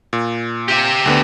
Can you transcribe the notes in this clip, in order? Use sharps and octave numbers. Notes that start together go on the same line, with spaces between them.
A#2
G4 E5
D2 D3 B3